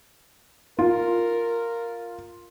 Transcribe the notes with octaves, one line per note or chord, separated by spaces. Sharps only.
F4 A#4